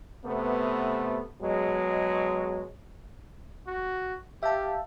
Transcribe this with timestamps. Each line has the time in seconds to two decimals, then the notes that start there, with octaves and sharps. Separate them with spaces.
0.24 C3 A3 B3
1.41 B2 F#3 G#3
3.67 F#4
4.43 G4 E5 F5 A5